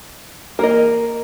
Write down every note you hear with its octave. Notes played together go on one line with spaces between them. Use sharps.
A#3 A#4 D#5